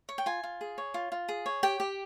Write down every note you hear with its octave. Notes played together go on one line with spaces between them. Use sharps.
C#5
G5
F4 G#5
F4
G#4
C#5
F4
F4
G#4
C#5
G4 G5
G4